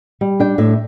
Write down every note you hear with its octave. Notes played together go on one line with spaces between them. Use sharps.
G3
D4 G5
A2 E5